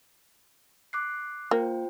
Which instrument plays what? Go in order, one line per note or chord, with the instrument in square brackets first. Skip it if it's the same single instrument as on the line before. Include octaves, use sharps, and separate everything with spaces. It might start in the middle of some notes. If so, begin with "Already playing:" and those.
[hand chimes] D6 F#6 C7
[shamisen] A#3 [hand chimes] F4 C5 G5